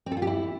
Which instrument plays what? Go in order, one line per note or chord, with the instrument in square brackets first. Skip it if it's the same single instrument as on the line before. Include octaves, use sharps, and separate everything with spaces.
[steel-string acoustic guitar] C4
A4
F4
G4
E4